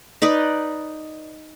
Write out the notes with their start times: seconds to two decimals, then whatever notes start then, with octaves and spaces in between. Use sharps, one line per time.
0.22 D#4 B4 D5 D#5